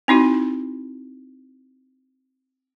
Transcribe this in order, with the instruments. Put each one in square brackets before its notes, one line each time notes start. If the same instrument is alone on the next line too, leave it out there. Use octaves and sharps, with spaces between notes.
[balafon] C4 D#4 E4 F#4